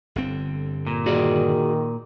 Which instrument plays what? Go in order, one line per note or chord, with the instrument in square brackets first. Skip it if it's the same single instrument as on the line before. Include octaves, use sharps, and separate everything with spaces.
[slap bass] G1 D3 C4
[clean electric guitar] A#2
[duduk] D#3 [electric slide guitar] F#4 G#4 D5